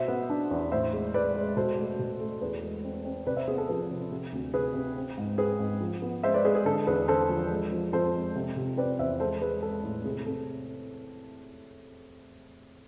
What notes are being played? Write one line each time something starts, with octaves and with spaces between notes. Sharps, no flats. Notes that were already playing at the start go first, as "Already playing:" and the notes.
Already playing: B2 C5 E5
B3
D4
E2
A2 C5 E5
G#3
G#3 B4 D5
G#3
B2 A4 C5
A3
B2
A3
E2 G#4 B4
G#3
C4
C4
C3 B4 D5
C5 E5
B3 G#4
A4
F3 G#4 B4
C3
C3
D2
C3 G#4 B4
C3
C4
G#2
C4 G#4 B4
G#2
F3
B3
G#3 C5 E5
B4 D5
G#3 G#4 B4
G#4
D3 A4
E2 G#4 B4
D3 A4 C5
F3
G#3
F3
F2 A4 C5
G#3
C3
C3
C4 B4 D5
E2 C5 E5
G#3 A4 C5
G#3 G#4 B4
G#3 A4
A2
C3 G#4
C3 A4